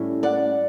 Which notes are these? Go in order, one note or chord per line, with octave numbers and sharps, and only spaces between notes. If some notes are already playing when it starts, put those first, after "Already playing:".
Already playing: A2 G3 C#4
D5 F#5